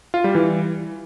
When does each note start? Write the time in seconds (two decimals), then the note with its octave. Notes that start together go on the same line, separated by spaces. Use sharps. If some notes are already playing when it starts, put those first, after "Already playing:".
0.14 F4
0.24 G3
0.35 E3